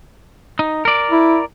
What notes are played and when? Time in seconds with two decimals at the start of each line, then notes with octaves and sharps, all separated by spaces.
0.59 D#4
0.85 A#4 D5
1.11 E4